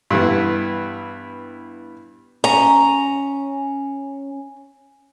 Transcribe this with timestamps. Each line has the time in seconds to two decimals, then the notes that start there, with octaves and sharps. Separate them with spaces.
0.10 G2 E3 B3
2.44 C#4 A#5